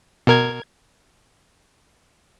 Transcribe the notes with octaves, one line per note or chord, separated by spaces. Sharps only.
B2 A#4 G#6